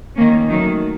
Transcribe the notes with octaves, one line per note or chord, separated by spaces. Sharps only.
D#3 A#3 C#4
D#3 F#3 A3